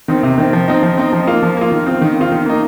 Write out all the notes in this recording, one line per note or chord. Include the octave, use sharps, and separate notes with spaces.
D#3 C4
C3
D#3 C4
F3
C4 D#4
F3
C4 D#4
F3
A#3 F4
F3
A#3 F4
D#3
C4 F4
D#3
C4 F4
D#3
A#3 D#4